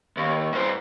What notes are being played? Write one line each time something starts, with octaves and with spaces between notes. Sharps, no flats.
D#2
G2 C5